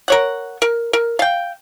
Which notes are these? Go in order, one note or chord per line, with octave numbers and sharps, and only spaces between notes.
A#4 C#5 F#5
A#4
A#4
F5 G5